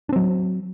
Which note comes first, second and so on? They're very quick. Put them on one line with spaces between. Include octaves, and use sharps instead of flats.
D4 C4 F#3